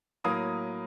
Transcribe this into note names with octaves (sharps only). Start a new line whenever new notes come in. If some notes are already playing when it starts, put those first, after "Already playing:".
A2 F#3 A#3 D#6